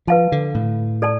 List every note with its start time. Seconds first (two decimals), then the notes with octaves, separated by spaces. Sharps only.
0.07 F3 B4 F5 A5
0.32 D3
0.55 A2
1.02 A4 D5 A5